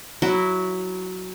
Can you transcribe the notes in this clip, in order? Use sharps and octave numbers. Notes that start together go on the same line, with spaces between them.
F#3 E4 F#4